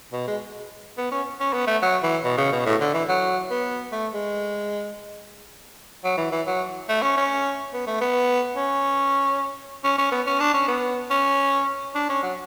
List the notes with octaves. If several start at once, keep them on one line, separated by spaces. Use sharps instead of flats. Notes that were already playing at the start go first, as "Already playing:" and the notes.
B2
G#3
B3
C#4
C#4
B3
A3
F#3
E3
B2
C#3
B2
A2
D3
E3
F#3
B3
A3
G#3
F#3
E3
E3
F#3
A3
C#4
C#4
B3
A3
B3
C#4
C#4
C#4
B3
C#4
D4
C#4
B3
C#4
D4
C#4
F#3